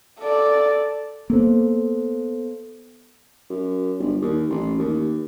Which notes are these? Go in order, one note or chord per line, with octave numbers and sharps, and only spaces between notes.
A4 D5
A#3 B3 A4 C5
F#2
G1
D#2
A1
D#2